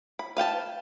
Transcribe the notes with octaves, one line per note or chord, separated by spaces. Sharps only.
B5
B4 F5 G5 A5